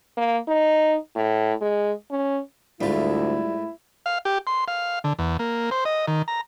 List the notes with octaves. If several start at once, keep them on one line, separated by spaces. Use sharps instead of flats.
A#3
D#4
A2
G#3
C#4
D2 G#2 G3 A3 E4 F4
F5
G4
C6
F5
D3
E2
A#3
C5
D#5
D#3
A#5